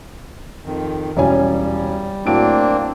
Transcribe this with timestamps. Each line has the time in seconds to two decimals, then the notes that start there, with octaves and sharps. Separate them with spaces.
0.66 F2 D#3
1.17 E1 G3 C#4 G#5
2.26 A2 F#3 A#3 C4 D4 D7